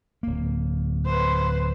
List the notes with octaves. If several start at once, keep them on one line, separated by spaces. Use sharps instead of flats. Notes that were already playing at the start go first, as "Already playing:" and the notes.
D1 A#3
B4 C5